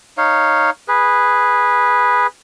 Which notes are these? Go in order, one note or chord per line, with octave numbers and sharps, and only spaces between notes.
D#4 C#5 F5
G#4 B4